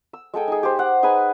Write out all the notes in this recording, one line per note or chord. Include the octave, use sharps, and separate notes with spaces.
E6
G#3 A4 G5 G#5
D#4 G#4
G4 C5
F#5
D#4 G#4 B4 G#5